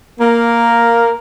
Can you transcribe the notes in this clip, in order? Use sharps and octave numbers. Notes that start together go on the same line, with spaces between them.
A#3 A#4